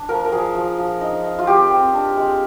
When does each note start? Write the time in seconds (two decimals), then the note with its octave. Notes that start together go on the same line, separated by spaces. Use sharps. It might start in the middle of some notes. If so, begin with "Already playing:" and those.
Already playing: D4
0.09 F3 A#4
0.25 A#4
0.32 F3 G#4
0.55 F3
0.78 F3
1.01 D#4
1.24 D#4
1.39 F4
1.47 C4 G4
1.70 C4
1.94 D4
2.17 G#3